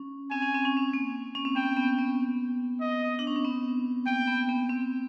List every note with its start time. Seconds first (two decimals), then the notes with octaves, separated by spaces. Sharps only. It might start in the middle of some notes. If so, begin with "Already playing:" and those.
Already playing: C#4
0.31 C4 G#5
0.42 C#4
0.55 C4
0.65 C#4
0.77 C4
0.94 A#3
1.35 C#4
1.45 C4
1.56 B3 G5
1.77 B3
1.98 B3
2.81 D#5
3.19 D4
3.27 C#4
3.36 C4
3.44 B3
4.07 A#3 G5
4.28 B3
4.49 B3
4.70 C4